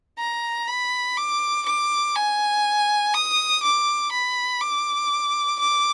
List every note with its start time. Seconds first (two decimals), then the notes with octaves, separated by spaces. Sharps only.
0.19 A#5
0.68 B5
1.17 D6
1.66 D6
2.15 G#5
3.14 D#6
3.63 D6
4.12 B5
4.61 D6
5.59 D6